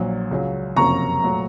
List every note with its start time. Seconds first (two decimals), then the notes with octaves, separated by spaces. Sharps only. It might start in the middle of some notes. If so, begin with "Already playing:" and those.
Already playing: A#1 A#2 F#3
0.31 C#2 C#3 F#3
0.77 F#1 F2 C3 F#3 A#3 A#5 C#6
1.24 A#2 F#3 A3